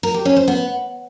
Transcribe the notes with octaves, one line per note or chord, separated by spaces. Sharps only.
A#4
G4
C#4
C5
B3